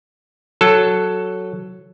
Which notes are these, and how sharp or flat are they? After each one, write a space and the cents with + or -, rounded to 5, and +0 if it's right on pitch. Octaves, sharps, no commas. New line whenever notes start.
F#3 +0 A4 +0